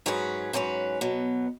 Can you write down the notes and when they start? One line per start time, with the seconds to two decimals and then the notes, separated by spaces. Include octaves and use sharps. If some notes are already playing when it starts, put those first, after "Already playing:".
0.06 G#2 F#3 C#4 G#4 B4
0.53 G#2 F#3 C#4 G#4 B4
1.01 B2 F#3 B3